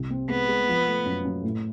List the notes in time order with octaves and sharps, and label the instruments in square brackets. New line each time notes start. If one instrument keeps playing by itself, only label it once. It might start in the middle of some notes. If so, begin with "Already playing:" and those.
Already playing: [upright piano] C2
C4
[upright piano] G#3 [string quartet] B3
[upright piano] G#3
F3
A3
F#2
F#2
A2